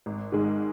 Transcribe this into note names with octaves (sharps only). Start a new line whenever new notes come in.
G#1
G#2 D#3 G#3